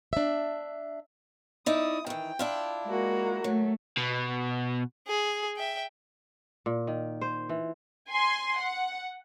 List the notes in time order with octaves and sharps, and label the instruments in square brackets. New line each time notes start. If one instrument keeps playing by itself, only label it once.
[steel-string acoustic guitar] D4 E5
[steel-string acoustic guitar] D#4 E4 D5 [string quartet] D#6
[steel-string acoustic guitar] D#3 E3 [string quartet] G5
[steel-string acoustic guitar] D4 E4 F4
[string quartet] G#3 A#3 F#4
[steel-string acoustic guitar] F#3 [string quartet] A3
[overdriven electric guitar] B2
[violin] G#4
E5 G5
[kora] A#2
D#3
C5
E3
[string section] G#5 C6
F#5